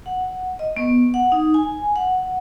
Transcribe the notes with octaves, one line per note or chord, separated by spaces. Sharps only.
F#5
D#5
B3
F#5
D#4
G#5
F#5